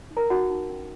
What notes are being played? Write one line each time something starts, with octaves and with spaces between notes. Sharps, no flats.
D#4
A#4 A#5
D#4 F#4 F#5
D#4
C#4